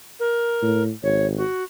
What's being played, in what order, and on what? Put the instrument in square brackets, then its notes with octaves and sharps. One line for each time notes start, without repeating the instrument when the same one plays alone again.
[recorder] A#4
[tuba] A2
[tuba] G#1 [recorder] C#5
[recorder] F#4